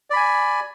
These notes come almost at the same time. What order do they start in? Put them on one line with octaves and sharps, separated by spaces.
D5 B5 G#5